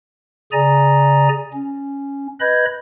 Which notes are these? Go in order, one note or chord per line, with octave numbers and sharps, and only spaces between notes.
C#3 G#4 D5 G#5 A#5 A#6
C#4
B4 D#5 B5 G6 G#6 A#6